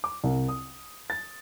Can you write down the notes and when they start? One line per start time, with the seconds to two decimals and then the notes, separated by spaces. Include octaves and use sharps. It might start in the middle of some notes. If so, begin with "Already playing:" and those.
0.04 D6
0.24 C2
0.49 D#6
1.10 A6